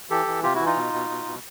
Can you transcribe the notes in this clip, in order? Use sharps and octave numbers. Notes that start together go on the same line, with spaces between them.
E3 G4 A4
E3
C3 F4 G4
E4 F#4
E3
D#4 F4
B2
B2
B2
B2